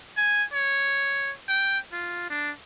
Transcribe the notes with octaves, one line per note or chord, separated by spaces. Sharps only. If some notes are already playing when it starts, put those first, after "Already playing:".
G#5
C#5
G5
F4
D4